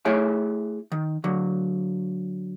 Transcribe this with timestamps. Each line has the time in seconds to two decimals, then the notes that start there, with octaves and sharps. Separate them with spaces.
0.05 A3 E4 G#4 C#5 E5 G5
0.92 D#3
1.24 D3 F#3